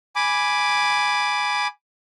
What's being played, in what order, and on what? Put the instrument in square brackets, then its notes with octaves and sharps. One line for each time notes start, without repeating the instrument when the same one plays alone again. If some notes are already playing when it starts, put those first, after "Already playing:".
[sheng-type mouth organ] G#5 B5 D6